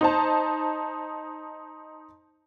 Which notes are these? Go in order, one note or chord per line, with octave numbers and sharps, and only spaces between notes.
D#4 C5 A5